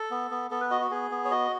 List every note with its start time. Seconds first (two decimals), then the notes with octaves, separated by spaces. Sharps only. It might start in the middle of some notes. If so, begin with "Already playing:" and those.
Already playing: A4
0.11 B3
0.31 B3
0.51 B3 A4
0.61 B4
0.71 F#4 D#5
0.81 F#4
0.91 B3 G#4
1.11 B3
1.25 C#5
1.31 F#4 D#5